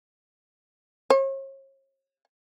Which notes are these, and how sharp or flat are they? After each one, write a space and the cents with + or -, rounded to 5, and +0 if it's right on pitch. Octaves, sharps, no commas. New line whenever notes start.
C#5 -40